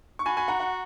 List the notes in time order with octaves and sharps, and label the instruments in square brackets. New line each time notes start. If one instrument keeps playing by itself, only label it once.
[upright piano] C#6
[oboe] F#4 [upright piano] G#5 B5
[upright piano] G#5 B5
F#5 A#5
F#5 A#5